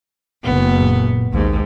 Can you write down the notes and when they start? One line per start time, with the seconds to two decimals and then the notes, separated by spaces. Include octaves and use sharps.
0.43 F#1 B3
0.81 A#2
1.33 A#1 D#2 G#2